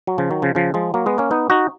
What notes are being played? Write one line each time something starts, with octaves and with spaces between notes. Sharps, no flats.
F#3
C#3 F3
D#3 F#3
C#3 F3
C#3 F3
F3 G#3
F#3 A#3
G#3 B3
A#3 C#4
B3 D#4
D#4 F#4